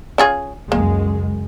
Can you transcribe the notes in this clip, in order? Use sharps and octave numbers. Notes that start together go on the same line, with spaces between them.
C#4 F4 G#4
C#2 F#2 G#3 A#3